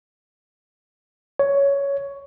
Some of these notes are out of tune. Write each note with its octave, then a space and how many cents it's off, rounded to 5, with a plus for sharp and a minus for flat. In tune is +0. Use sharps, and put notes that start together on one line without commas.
C#5 +10